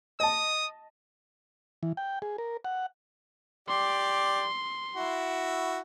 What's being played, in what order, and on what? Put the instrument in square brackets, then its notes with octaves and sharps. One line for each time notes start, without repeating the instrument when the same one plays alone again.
[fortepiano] D#5 A5 [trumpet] D#6
[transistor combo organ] E3
G5
G#4
A#4
F#5
[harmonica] G4 D5 [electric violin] C6
[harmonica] E4 F#4